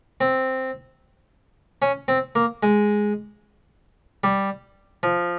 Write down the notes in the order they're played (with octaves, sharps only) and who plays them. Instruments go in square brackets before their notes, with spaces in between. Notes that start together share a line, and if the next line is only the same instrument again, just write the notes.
[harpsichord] C4
C#4
C4
A#3
G#3
G3
F3